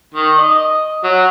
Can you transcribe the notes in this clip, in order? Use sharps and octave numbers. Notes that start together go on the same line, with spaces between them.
D#3
D#5
F#3